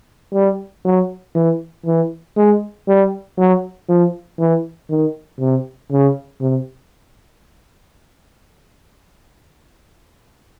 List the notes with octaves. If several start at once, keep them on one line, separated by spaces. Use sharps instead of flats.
G3
F#3
E3
E3
G#3
G3
F#3
F3
E3
D#3
C3
C#3
C3